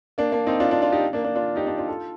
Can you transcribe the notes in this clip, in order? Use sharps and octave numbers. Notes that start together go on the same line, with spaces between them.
A#3 D4
A#3 D4
C4 D#4
D4 F4
D4 F4
D4 F4
D#4 G4
A#3 D4
A#3 D4
D4 F4
D#4 G4
D4 F4
D4 F4
F4 A4